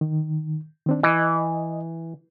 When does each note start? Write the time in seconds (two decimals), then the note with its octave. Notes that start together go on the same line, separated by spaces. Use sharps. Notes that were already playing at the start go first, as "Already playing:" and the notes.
0.01 D#3
0.86 D#3 C4 D4
1.03 E3 D#5